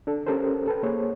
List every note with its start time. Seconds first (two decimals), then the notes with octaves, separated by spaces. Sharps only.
0.07 D4 A4
0.26 C#4 G4 A4 A#4 C5
0.67 A4 B4 G5
0.83 A#3 G#4 C5 C#5